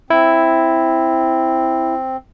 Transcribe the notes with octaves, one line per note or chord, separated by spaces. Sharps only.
C4 E4